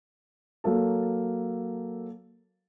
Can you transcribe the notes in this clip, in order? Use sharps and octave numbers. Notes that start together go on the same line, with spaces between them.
F#3 A#3 A4